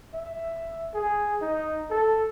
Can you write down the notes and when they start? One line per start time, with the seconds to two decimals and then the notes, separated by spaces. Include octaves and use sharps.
0.14 E5
0.94 G#4
1.41 D#4
1.90 A4